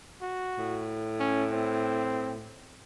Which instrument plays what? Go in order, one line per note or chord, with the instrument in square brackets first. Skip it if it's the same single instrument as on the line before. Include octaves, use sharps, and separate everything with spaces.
[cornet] F#4
[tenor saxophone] A2
[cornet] C#4
C4